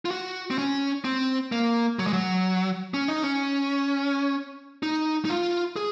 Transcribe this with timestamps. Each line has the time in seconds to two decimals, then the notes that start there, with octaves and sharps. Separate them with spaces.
0.05 F4
0.11 F#4
0.51 C4
0.58 C#4
1.05 C4
1.52 A#3
1.99 F#3
2.07 G#3
2.13 F#3
2.94 C#4
3.08 D#4
3.22 C#4
4.83 D#4
5.25 D#4
5.30 F4
5.76 G#4